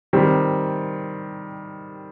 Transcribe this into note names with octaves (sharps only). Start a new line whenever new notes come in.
D#3 G3 C4